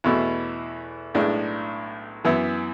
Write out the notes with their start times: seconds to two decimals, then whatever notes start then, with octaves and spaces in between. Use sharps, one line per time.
0.04 E2 B2 A3 E4
1.14 B1 A2 G#3 D4
2.24 F#2 E3 B3 E4